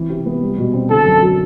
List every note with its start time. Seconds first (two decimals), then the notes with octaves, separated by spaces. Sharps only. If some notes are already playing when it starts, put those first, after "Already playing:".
Already playing: E3 C4
0.09 C3
0.26 B3
0.42 G3
0.58 B2
0.74 C4
0.90 D3 A4
1.06 F#2
1.22 F#3